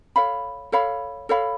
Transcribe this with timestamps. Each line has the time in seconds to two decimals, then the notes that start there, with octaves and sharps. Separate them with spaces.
0.16 A4 C#5 F5 B5
0.72 A4 C#5 F5 B5
1.29 A4 C#5 F5 B5